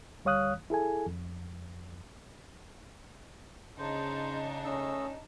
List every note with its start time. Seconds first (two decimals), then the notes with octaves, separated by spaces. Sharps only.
0.25 D2 G3 C#5 F5 D#6 F#6
0.70 E4 G#4 A4 G#5
1.06 F2
3.78 C#3 D4 D#4 C5 A5
4.65 A3 C#4 D#5 E6